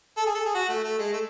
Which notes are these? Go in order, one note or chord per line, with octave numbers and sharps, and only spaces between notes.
A4
G#4
A4
G#4
F#4
A3
A3
G#3
A3